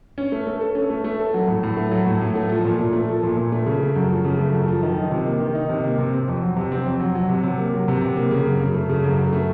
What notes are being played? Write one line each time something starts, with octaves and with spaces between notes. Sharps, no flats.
C#4
A3
A3
A4
C#4
A3
A3
A4
F#3
A2
A2
A3
F#3
A2
A2
A3
F3
A#2
A#2
A3
F3
A#2
A#2
A3
C#3
A3
F#2
F3
C#3
A3
F#2
F3
D#3
D#4
C3
A#3
D#3
D#4
C3
A#3
C3
C4
F2
F#3
C3
C4
F2
F#3
F#3
C3
C3
A#3
F#3
C3
C3
A#3
C#3
F#2
F#2
A3
C#3
F#2
F#2
A3